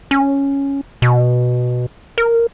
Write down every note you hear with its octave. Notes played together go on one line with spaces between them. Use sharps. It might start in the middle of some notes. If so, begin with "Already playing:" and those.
C#4
B2
A#4